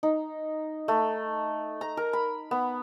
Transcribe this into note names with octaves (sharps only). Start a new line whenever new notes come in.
D#4
A3
A#5
A#4
B5
B3